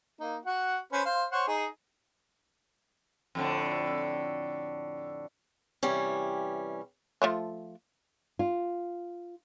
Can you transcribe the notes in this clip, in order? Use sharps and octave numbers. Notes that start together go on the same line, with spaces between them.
A#3 D#4
F#4 F#5
C#4 B4 C5
C5 F5
C5 C#5 F#5
D#4 G#4
F2 A2 D3
C3 E3 G3 C#4
F3 A3 F4
F4